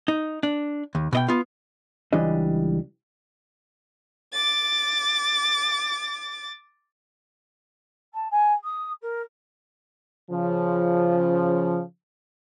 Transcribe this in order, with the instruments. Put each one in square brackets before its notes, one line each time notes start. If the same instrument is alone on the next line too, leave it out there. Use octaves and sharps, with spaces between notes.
[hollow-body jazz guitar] D#4
D4
D#2
B2 D#5 G5
B3 F4
C#2 E3 G3 D4 D#5
[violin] D6 A6
[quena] A5
G#5
D#6
A#4
[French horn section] C#3 F3